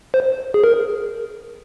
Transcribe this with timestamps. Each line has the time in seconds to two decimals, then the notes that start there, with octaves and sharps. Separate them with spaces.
0.14 C5
0.54 G#4
0.64 A#4